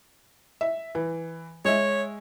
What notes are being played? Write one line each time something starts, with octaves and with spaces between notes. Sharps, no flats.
E5
E3
G#3 C#5 E5